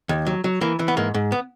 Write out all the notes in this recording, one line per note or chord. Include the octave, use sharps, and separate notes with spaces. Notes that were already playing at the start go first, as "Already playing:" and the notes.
D#2
F#3
F#3
E3 A#3
E3
B3
G#2 A#3
G#2
B3